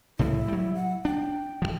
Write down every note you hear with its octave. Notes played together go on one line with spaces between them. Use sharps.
C2 A2 F3 E4
F#3 G3
F#5
D4 G5
D1 D#2 F3